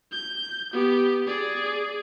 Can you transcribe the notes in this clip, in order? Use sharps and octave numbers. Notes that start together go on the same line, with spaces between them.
G6
B3 G4
G#4 D5